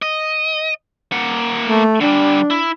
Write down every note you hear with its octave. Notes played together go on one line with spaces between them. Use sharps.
D#5
A#3 F#5
A3
D3 G3 D4
E4